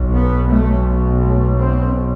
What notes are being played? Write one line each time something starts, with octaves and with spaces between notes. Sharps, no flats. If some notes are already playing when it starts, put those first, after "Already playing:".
Already playing: B1 B2
B3
A3
A3
C4